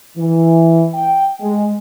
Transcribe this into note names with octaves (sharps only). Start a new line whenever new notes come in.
E3
G5
G#3